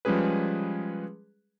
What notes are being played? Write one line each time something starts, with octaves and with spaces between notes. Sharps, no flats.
F3 G3 G#3 C#4 G#4 B4